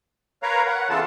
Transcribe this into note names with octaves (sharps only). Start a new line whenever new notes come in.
A#4 B4 C#5 F5 A#5
F#5
C#3 E3 B3 F4 A4 A5